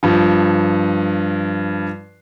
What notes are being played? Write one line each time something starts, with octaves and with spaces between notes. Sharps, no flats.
G2 F3